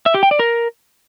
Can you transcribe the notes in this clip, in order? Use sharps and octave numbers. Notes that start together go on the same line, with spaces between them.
E5
G4
G5
D5
A#4